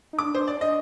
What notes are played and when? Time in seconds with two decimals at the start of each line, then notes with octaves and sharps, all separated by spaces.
0.13 D#4
0.18 D4 D6
0.35 C5
0.47 D5
0.61 D#5